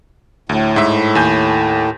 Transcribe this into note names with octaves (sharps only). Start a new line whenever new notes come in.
D2 A2
G#2 E5
D#2 G#5 G6